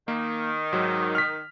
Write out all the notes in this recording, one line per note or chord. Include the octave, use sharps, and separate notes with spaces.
D#3 A#3
G#2 F#3
F6 B6